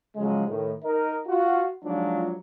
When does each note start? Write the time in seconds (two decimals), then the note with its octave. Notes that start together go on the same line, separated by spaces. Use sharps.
0.16 C#3 F3 F#3 G#3
0.47 A2 D#3
0.83 D#4 A#4 D#5
1.27 F4 F#4
1.84 F3 F#3 G#3 D4 D#4 F4